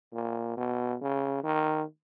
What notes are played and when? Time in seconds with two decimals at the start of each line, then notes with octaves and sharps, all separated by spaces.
0.13 A#2
0.57 B2
1.01 C#3
1.44 D#3